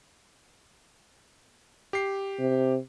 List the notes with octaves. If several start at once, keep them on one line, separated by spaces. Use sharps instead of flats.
G4 C7
C3